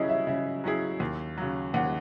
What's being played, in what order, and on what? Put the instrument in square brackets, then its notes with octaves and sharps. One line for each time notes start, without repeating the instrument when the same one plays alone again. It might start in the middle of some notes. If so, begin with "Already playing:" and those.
Already playing: [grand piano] C#3 F#3 C#4 E4 G#4 [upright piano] F#4 D#5
[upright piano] E5
[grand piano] C#3 [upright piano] E5
[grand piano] F#3 C#4 E4 G#4
D#2
C#3 F#3
[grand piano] D#2 [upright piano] F#5